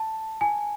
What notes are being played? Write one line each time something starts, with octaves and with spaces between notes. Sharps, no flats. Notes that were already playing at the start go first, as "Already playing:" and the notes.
Already playing: A5
G#5